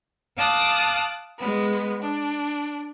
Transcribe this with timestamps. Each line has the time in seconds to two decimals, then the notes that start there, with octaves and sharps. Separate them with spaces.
0.37 F5 A5 D6 D#6 F#6
1.38 G#3 B3
2.00 D4